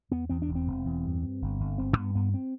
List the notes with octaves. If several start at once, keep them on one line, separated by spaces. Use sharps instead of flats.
E2 B3
E2 C4
D4
E1
C4
E1
E2
G2
G2
G1
G1
G1 C4
G2 B3
G2 B3
C4